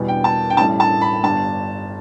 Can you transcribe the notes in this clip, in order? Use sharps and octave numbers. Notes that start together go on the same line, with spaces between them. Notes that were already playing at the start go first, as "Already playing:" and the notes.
Already playing: E2 B2 G3
G5
A5
G5
A1 A2 G3 A5
A5
B5
G1 G2 G3 A5